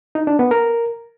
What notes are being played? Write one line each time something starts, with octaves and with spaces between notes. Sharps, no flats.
D#4
D4
B3
A#4